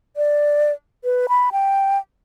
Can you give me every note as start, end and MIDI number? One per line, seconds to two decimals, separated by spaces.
0.17 0.72 74
1.04 1.27 71
1.29 1.50 83
1.52 1.98 79